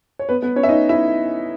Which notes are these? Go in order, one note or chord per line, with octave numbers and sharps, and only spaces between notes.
C#5
B3 B4
B3 B4
C#4 C#5
E5
D#4 D#5
E4 E5